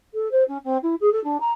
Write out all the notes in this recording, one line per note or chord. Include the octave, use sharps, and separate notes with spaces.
A4
C5
C#4
C4
E4
G#4
A4
D4
A#5